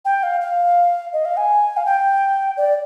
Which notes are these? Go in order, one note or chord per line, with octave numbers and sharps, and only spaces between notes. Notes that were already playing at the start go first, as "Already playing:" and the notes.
G5
F5
F5
D#5
F5
G#5
F5
G5
D5